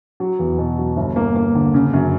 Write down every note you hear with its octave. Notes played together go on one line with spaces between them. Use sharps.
F#3
E2
B2
F#3
G1
A#3
A#3
D3
C#3
F#2